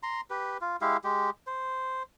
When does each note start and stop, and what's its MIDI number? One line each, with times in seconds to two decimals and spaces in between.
0.03 0.21 82
0.03 0.21 84
0.30 0.58 67
0.30 0.58 71
0.61 0.77 65
0.81 0.97 56
0.81 0.97 64
0.81 0.97 67
0.81 0.97 77
1.04 1.30 56
1.04 1.30 67
1.47 2.03 72